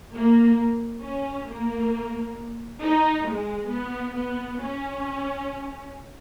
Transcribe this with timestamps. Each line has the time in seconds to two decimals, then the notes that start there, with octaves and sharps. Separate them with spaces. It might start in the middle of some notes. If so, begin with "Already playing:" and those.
0.14 A#3
1.03 C#4
1.48 A#3
2.81 D#4
3.27 G#3
3.71 B3
4.15 B3
4.60 C#4